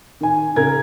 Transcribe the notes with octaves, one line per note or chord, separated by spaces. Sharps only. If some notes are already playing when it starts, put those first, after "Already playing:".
D#3 G#5
C#3 A#4 G#6